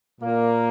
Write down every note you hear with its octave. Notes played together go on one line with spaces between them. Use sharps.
A#2 A#3